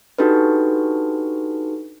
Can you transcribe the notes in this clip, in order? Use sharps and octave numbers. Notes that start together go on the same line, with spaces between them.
D4 D#4 F#4 G4 A4 B4